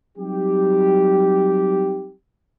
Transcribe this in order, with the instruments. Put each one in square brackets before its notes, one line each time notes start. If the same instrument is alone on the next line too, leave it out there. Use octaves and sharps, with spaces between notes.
[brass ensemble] F#3 G3 C4 D#4 G4